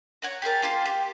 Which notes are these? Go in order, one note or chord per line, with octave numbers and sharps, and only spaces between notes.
C#5 F#5 A#5
G4 G#4 A#4 A5
A#3 F4 G4 C5
G4